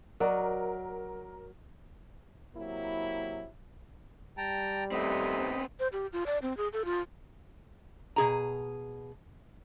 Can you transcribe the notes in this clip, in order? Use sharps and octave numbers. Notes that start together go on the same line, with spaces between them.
F#3 F#4 A#4 D5 D#5
C3 F#3 A#3 E4
G3 G5 A5 A#5
D#2 C3 A3 B3 C4 D#5 B5
C5
G4
F4
D5
C4
G#4
A4
F4
B2 G#4 A#5